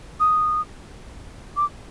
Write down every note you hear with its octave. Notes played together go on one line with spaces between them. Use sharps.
D#6
D6